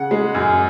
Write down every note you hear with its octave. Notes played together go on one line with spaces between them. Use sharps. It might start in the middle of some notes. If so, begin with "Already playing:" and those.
Already playing: C#3 F#5
G#3
F#2